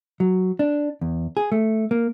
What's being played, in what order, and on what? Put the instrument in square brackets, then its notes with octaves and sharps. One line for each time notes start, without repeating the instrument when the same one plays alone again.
[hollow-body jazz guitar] F#3
D4
E2
G#4
A3
A#3